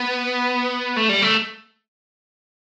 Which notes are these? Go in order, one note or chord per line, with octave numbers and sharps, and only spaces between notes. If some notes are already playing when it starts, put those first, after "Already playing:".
Already playing: B3
A3
G3
A3